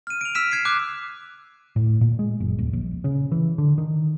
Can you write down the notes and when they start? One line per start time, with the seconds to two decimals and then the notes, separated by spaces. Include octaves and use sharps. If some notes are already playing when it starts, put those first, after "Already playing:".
0.07 F6 D#7
0.21 D7 F7
0.35 E6 F6 B6 D7 E7
0.51 F6 G#6 C7 D7
0.65 D6 F#6
1.76 A2
2.01 A#2
2.19 G#3
2.40 F#1
2.59 D#1
2.73 A#1
3.04 C#3
3.32 E3
3.58 D3
3.78 D#3